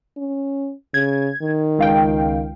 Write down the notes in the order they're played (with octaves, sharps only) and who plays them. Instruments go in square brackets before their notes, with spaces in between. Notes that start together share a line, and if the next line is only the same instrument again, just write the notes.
[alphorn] C#4
[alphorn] C#3 [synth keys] G#6
[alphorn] D#3
[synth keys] C#2 F5 G5